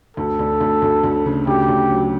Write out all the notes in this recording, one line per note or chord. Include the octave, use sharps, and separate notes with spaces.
D2 A4
D2
D2
D2
D2
C#3
D2 G4
D2
F#3